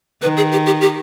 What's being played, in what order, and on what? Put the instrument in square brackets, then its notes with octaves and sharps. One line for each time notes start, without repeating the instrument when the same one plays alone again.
[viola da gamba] D#3 [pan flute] B4
[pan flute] G#4
G4
G4
G4